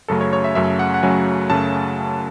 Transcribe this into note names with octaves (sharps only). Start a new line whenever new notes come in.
F#2 C#3 F#3 A3 A4
C#5
C#5
E5
F#2 C#3 F#3 A3 E5
F#5
F#5
F#2 C#3 F#3 A3 G#5
F#2 C#3 F#3 A3 A5